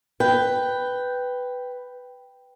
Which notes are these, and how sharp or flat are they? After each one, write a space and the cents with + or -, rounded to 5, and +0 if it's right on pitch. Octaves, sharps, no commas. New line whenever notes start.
B4 +5 G5 +0